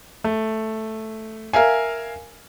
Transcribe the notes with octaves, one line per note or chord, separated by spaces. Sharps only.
A3
A#4 E5 F5 G#5